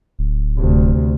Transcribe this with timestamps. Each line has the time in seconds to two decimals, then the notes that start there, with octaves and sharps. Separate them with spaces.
0.19 D1
0.58 D2 C3